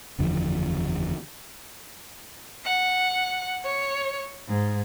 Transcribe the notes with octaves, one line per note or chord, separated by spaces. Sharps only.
F#1 E2 D3 F3
F#5
C#5
G#2